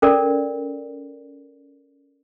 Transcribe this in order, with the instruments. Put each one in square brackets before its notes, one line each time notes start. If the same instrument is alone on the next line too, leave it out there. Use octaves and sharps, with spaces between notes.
[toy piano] C#4 A4 A#4 D5